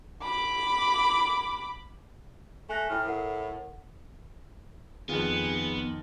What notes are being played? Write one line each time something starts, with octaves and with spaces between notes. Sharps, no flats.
B5 D6
A3 G#5 F#6 A#6
A2 E4 G5 F6
A4 A#4 F#5
F2 D#3 B3 F4 G#4